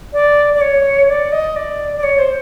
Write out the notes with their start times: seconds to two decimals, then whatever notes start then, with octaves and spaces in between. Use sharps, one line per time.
0.13 D5
0.54 D5
0.61 C#5
1.08 D5
1.32 D#5
1.56 D5
1.97 D5
2.03 C#5
2.19 C5